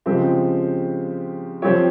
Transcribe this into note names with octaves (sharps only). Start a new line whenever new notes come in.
C#3 F3 G#3 C4 G4
F3 C4 G4 C#5